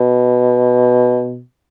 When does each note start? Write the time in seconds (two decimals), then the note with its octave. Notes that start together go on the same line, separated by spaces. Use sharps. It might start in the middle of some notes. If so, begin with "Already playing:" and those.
Already playing: B2